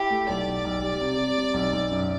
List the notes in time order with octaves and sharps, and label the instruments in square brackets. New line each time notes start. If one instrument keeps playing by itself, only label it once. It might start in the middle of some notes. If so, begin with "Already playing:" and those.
Already playing: [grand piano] E4 [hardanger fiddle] G4
[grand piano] A3
[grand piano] B1 [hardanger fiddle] D5
[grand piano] B1
B1
G3
C3
C3
G3
B1
B1
F#2